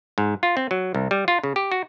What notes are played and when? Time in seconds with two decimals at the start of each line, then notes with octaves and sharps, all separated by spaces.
0.18 G#2
0.43 F4
0.57 C4
0.71 F#3
0.95 C2
1.11 G3
1.28 F4
1.43 C#3
1.56 G4
1.72 F#4